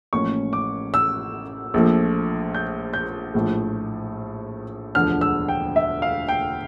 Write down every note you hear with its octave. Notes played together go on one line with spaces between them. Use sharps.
A1 A2 F3 A#3 C#4 C#6
D6
E6
A#1 A#2 F3 A3
G6
G6
A#1 A2 F3
E1 D2 D3 F3 F6
E6
G5
E5
F5
G5